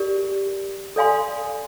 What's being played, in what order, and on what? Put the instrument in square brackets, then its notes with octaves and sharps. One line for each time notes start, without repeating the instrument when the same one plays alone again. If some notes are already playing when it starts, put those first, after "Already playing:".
Already playing: [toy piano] G4 A#4 D5
A4 D5 F5 G#5 C6